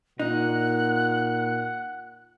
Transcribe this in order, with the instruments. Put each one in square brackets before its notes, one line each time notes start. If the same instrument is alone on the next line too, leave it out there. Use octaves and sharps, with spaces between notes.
[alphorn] A#2 [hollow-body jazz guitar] D#4 [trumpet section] F#5 [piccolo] F#6